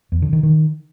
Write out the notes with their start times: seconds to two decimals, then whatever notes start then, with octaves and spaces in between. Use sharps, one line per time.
0.12 E2
0.22 D3
0.33 D#3
0.43 D#3